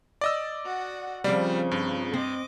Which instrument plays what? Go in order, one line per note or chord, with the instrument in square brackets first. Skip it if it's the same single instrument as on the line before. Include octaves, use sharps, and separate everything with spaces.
[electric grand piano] D5 D#5 E6
[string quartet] F#4 F#5
[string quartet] C#3 [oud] F3 C4 D5 [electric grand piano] G3
[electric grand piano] G2
[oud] C4 [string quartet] D#5 D6